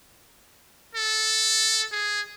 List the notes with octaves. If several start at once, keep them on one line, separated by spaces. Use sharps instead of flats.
A4
G#4